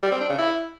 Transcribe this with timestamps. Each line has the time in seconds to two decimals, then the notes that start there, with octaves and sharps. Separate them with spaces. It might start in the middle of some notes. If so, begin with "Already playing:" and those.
0.03 G3
0.12 C4
0.21 D4
0.30 C#3
0.38 E4